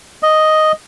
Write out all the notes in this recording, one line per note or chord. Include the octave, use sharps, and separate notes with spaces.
D#5